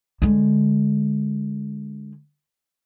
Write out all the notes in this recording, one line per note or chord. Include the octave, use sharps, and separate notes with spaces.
D3 G#3